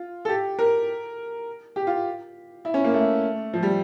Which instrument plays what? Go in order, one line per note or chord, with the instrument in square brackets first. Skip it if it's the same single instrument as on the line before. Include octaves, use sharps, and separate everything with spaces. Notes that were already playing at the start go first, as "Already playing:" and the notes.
Already playing: [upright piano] F4
A4
G4
A#4
G4
F4
E4
C#4
A#3
A3
F3
G3